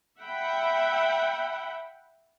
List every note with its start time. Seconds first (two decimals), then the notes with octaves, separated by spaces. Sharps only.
0.19 E5 F#5 G5 B5